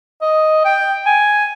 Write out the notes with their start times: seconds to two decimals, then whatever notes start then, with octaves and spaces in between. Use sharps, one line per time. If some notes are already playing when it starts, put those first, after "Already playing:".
0.22 D#5
0.65 G5
1.06 G#5